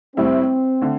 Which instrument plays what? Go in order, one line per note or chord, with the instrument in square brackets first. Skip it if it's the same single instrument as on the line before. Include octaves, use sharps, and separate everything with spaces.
[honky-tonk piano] A2 G3 E4 [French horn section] C4
[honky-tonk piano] D3 A3